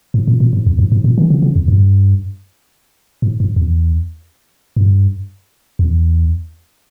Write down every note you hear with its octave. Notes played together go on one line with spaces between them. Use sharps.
G#2
A#2
A#2
G#2
E2
G2
G#2
A#2
D#3
C#3
C#3
E2
G2
G#2
G2
E2
G2
E2